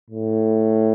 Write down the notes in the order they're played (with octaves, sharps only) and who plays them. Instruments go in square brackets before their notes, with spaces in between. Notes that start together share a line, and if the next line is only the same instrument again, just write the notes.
[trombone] A2